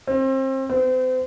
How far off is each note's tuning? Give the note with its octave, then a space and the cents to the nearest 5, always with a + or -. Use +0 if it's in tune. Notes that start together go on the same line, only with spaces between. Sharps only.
C4 +30
C4 -35